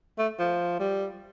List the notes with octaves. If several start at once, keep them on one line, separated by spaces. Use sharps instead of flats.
A3
F3
G3